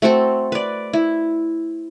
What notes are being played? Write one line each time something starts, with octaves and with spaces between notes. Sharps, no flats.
A3 C4 F#4 A4
B4 D5
E4